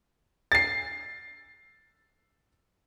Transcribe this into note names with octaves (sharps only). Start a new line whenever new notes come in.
A6 C7